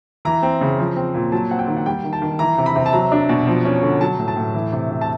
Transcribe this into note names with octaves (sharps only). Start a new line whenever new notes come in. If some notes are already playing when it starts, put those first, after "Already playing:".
E3 A#5
C4
C#3
F3
C4
A#2
F#3 A5
C4 F#5
G5
D#3
F#5
G3 G5
D#3
A5
D#3
E3 A#5
C3
B5
C3
A5
F#3 A#5
D4
B2
F3
C#4
D3
F#3 A5
A2
A5
A2
E3
C3
C3
A5